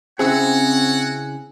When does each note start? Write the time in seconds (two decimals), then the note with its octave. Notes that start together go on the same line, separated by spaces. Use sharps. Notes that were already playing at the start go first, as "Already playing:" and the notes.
0.19 C#3 C4 E4 F#4 G#4 C#5 F#5